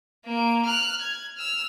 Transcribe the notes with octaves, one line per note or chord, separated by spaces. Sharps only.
A#3 D7
F6 F#6
G#6
E6 F6